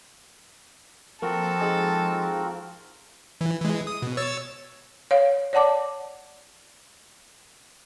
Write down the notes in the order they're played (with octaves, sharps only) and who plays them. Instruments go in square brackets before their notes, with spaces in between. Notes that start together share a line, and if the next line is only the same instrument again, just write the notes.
[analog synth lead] F3 [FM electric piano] A#3 [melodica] C4 F#4 A#4 [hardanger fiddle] A4
[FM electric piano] G#3 D#4 G#4
[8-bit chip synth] E3
E3 G#3
D#6
B2
C#5 E6 A6
[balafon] C#5 F5
C#5 D5 F#5 A5 D6